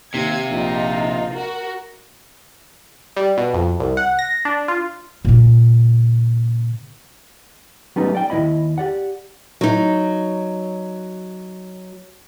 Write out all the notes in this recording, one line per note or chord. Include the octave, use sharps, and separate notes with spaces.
D#2 C3 F5 G#6
A#1 D#4 F4
F#4 A#4
G3
B2
F2
C2
F#5
A#6
D4
F4
A#2 C#3
F#3 G3 A3 B3 C#4 D#4
D5 G5
D#2 F3 E4 D#5 B5
G4 D5 F#5
F#3 D#4